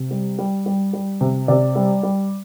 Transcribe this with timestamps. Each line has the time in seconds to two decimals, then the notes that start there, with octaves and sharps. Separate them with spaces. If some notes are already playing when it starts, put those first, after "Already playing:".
Already playing: C3
0.11 G3
0.38 G3
0.66 G3
0.93 G3
1.21 C3
1.48 C3 D5
1.76 G3
2.03 G3